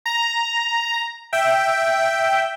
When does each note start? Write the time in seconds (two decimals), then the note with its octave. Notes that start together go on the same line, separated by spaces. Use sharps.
0.06 A#5
1.33 E5 G5